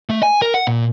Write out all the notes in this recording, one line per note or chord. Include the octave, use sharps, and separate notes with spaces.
A3
G#5
A#4
F#5
A#2